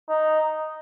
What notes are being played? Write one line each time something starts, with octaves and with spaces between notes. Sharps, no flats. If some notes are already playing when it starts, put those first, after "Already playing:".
D#4